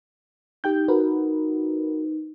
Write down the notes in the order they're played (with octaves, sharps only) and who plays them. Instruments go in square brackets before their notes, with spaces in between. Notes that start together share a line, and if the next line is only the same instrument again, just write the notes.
[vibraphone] D#4 [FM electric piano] G4 G5 G6
[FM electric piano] F#4 A#4 B4